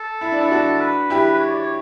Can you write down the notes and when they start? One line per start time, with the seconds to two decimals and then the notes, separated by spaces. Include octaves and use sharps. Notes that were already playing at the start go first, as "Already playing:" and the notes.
Already playing: A4
0.21 E4
0.32 D4
0.41 E4
0.51 D4 F#4
0.81 B4
1.10 E4 G4
1.34 B4
1.40 C#5
1.50 D5
1.61 C#5